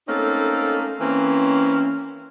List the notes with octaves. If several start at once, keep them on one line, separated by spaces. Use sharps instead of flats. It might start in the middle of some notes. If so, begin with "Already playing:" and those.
A3 A#3 C4 C#4 D#4 A4
E3 A#3 C4 C#4